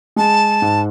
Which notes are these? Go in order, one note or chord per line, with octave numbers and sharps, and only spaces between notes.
G#3 A5
G#2